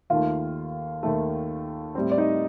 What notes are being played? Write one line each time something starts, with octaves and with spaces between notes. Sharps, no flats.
D#2 D#3 A3 F4 F5
D#2 D#3 A3
A2 G3 C4
D5
D#4 D#5